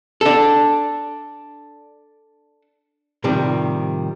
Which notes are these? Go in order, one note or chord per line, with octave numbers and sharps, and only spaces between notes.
D4 A4
A2 C3 D#3 F3 G3